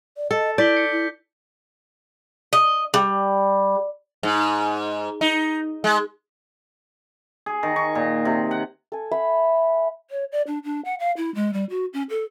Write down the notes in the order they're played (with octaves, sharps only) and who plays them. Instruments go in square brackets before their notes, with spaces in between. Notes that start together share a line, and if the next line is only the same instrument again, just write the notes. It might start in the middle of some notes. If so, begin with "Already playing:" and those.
[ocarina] D5
[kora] A4 [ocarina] D#5
[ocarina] E4 [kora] D5 [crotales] G6 B6 G7
[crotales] C#7
[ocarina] E4
[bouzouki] D#5
G3
[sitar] G#2
D#4
G#3
[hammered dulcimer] G#4
D#3
C#6
A#2
C3
F#5
[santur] A4 G#5
E5 F#5 B5
[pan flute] C#5
D5
D4
D4
F#5
F5
E4
G#3
G3
F#4
C#4
A4